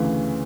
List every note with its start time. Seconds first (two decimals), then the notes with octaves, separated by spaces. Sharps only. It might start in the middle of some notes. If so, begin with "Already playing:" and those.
Already playing: D2 C#3 E3